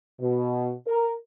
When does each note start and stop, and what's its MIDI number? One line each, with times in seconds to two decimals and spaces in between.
0.21 0.71 47
0.87 1.10 70